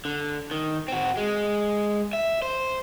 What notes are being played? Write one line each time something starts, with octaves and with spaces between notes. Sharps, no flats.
D3
D#3
C4 F#4
G#3
E5
C5